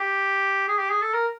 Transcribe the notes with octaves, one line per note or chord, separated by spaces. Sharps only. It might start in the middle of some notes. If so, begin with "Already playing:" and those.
Already playing: G4
G#4
G4
G#4
A4
A#4